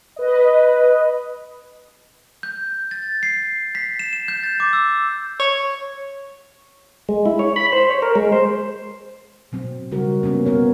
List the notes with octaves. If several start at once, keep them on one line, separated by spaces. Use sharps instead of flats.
B4 D#5
G6
A6
C7
B6
E7
E7
G6
A6
D6
E6
C#5
G#3
E4
C#5
B5
C5
C#5
A#4
G#3
C5
B2 F#3 C4
C#3 G3 F#4 A#4
A#3 B3 C#4
B3 A#4 C#5